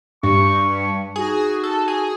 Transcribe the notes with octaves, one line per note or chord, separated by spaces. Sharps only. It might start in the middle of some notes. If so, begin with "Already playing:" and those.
G2 C#6
D#4 F#4 G#4
A4
G#4